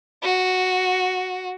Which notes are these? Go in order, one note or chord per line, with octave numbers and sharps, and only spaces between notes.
F#4